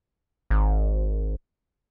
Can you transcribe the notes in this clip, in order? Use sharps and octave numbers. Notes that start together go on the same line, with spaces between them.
G#1